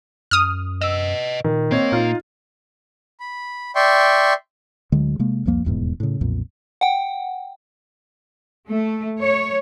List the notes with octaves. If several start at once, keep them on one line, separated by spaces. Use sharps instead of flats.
F#2 D#6 F6
B4 D#5 E6
A#2 D#3
A#3 C4 C#5 D#5
A#2 D#4 F4
B5
D5 E5 G5 C6 C#6
D2 D3 F#3 G#3
C3 G#3 A#3
C2 F2 F3 A#3
D#1 E2 G#2 B2
A2 C#3
B1 F2 A#2
F#5 G5
A3
C#5